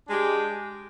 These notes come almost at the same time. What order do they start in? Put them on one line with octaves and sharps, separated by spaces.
D4 G#3 G4